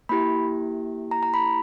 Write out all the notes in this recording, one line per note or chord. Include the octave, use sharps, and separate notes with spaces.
A#3 E4 G4 B5
A#5
A#5
B5